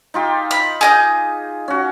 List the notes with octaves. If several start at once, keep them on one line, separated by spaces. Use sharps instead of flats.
D#4 F4 G4
B5
G#4 D#5 G6
C#4 F#4